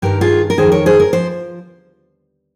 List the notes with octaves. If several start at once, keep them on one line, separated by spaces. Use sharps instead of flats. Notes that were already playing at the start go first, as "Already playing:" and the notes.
G2 D#3 G4 A#4
F4 G#4
A#4
F2 C3 D#3 G#4 C5
A#4 C#5
G#4 C5
A#4
F3 C5